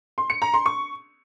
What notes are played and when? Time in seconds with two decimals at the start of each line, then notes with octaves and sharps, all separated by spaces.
0.18 C6
0.30 C#7
0.42 A#5
0.54 C6
0.66 C#6